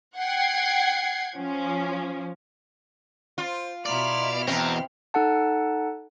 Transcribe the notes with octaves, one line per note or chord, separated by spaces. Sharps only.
F#5 G5 G#6 C7
F3 C#4
F4 C5
B2 E4 D5 A#5 C6 F6
E2 C4 D#5 A5 A#5
D#4 A4 F#5 A5